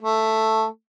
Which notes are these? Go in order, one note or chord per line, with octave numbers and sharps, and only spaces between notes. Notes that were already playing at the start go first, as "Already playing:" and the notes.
A3